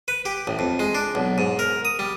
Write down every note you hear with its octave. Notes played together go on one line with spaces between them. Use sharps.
B4
G4
A1
F2
G#3
D4
B1
G#2
A#4
D#6
G3